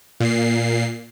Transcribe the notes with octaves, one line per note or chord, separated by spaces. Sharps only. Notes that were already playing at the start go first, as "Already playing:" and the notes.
A#2 C7